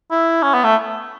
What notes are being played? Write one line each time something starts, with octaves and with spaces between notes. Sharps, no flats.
E4
C#4
B3
A3